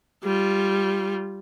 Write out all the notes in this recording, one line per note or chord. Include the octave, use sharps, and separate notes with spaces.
G3 F4